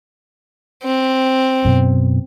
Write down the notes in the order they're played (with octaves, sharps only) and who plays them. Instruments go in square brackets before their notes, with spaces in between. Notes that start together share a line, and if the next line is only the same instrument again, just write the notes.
[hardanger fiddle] C4
[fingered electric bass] F#2 B2